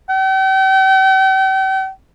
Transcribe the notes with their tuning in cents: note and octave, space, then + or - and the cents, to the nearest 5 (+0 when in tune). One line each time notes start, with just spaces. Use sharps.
G5 -40